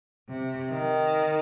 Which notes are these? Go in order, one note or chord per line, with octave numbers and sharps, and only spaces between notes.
C3
D#3